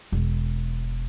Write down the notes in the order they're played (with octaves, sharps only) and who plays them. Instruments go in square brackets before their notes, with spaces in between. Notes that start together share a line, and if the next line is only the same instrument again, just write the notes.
[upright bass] E1